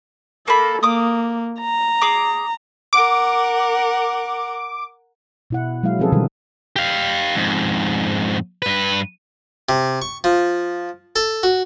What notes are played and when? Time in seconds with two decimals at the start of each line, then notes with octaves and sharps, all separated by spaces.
0.48 A#3 A4 B5
0.83 A#3 D6 D#6
1.61 A#5
2.02 G#4 D6
2.93 A#4 F#5 D6
5.50 B2 E4 F#5
5.83 F#3 G#3 A#3 E4 F5
5.99 F3 C4 C#4 G#4 A4 B4
6.12 B2 D3 D#3 G3 A4 A#4
6.76 G4 F5
7.35 F2 G#2
8.62 G2 B4
9.69 C3
10.02 C#6
10.24 F3
11.16 A4
11.43 F#4